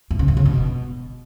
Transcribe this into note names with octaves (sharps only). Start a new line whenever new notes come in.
G2
C#3
G2
C#3
B2